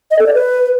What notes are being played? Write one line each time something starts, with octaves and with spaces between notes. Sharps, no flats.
D#5
A4
D5
B4